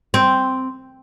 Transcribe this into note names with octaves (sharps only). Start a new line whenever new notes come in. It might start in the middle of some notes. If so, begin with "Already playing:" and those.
C4